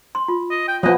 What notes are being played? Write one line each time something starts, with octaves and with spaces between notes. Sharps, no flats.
C6
F4
D#5
G5
F3 B3 D#5